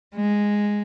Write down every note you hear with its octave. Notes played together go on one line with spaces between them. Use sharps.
G#3